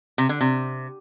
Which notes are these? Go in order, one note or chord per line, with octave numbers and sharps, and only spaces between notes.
C3
D3
C3